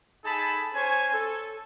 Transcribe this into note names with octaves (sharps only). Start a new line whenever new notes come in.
D#4 G#4 A4 G#5 A5 B5
C#4 C5 C#5 G#5
A4